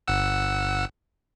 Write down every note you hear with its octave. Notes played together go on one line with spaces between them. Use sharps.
G1 F#5 E6